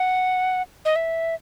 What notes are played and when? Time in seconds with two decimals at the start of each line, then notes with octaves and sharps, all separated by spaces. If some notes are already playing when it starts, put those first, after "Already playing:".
Already playing: F#5
0.85 D#5
0.96 E5